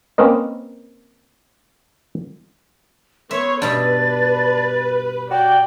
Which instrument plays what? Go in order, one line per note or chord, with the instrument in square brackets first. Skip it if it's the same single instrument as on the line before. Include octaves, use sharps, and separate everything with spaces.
[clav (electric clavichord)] A#3 C4 C#4 A#4 B4 D#5
[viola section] B3 C#5 [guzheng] E5 [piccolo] C6
[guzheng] G2 B2 E5 [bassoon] D4 [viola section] B4 [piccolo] A6
[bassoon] F#4 [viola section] D5 [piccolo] G5